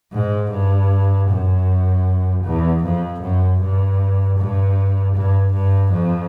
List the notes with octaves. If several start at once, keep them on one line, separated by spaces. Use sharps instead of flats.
G#2
G2
F#2
E2
F2
F#2
G2
G2
G2
G2
F2